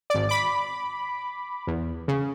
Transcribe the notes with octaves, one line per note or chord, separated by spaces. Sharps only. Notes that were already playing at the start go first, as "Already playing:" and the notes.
G#1 D5
B5 D6
E2
C#3